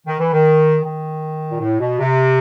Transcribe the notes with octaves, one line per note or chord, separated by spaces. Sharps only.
D#3
E3
D#3
D#3
A#2
A2
B2
C3